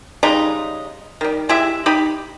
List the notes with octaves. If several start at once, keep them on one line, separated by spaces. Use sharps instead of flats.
C#3 G3 G#3 D#4
D#3 G3
G#3 E4 G4 E5
D#4 G4 B5